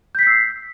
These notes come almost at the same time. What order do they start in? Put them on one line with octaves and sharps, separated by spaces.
G6 B6 C7 E6